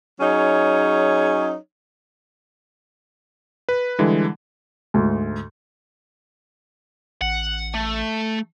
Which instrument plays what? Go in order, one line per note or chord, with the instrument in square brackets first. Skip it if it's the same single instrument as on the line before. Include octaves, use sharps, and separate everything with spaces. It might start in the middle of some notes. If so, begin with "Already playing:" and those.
[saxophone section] F#3 C#4 D#4 G#4 C#5
[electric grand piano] B4
D3 E3 G3 G#3
[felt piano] D2 G#2
[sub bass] A1 [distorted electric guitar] F#5
[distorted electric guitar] A3